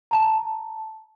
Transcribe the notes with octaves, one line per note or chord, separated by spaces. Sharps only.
A5 A#5